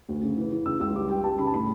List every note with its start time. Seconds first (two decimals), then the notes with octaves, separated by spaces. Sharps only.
0.09 D2
0.22 C#3
0.37 E3
0.52 E3
0.66 C#3 E6
0.80 C#2 E6
0.96 G3 D6
1.10 G3 G5
1.24 G3 A5
1.39 C#3 B5
1.47 A5
1.53 A2 B5